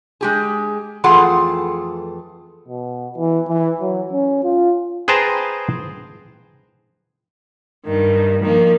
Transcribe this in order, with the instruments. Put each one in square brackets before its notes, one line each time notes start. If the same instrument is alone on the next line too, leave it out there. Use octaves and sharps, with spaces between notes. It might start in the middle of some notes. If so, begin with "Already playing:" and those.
[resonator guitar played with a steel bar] G#3 G4 G#4
F2 E3 A3 F4 G#4 F#5
[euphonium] B2
E3
E3
F#3
C#4
F4
[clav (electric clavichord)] G#4 B4 C5 G5 A5 A#5
[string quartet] G2 D#3
D#3 F3 A#3